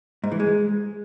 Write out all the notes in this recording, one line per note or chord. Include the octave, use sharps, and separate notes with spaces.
G#2
E3
G#3